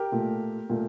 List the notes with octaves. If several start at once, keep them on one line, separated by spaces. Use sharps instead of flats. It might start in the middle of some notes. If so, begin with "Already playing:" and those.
Already playing: G4 A#4
A#2 A3
A#2 A3